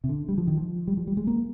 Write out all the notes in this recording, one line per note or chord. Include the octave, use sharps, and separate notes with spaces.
C3
D3
G3
F3
D#3
F3
G3
F3
G3
G#3
A#3